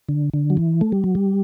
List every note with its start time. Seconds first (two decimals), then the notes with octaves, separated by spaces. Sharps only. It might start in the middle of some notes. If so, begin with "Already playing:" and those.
0.09 D3
0.34 D3
0.50 F#3
0.57 E3
0.81 A3
0.92 G3
1.04 F#3
1.15 G3